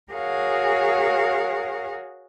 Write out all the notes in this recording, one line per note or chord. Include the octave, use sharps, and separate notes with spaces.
F#4 G#4 A#4 C#5 F5 F#5